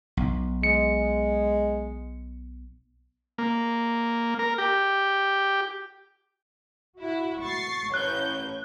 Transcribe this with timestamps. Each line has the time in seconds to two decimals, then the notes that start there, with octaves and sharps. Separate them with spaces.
0.17 B1
0.63 G#3 C#7
3.38 A#3
4.39 A#4
4.58 G4
6.99 E4 F#4
7.42 C#6 A6 C7
7.94 A1 C#5 F#6 G6